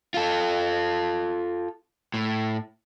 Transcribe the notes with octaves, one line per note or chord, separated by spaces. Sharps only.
F4 A4
A2